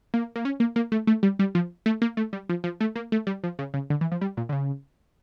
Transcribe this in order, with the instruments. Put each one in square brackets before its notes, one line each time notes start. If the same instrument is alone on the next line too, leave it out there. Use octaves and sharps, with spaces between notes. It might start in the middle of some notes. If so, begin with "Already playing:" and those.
[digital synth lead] A#3
A#3
C#4
A#3
A#3
A3
A3
G3
G3
F3
A3
A#3
A3
G3
F3
F3
A3
A#3
A3
G3
F3
C#3
C#3
D3
E3
F3
G3
A#2
D3
C#3